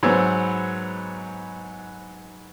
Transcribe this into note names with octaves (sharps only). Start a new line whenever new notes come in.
G#2 F#3 B3 C4 E6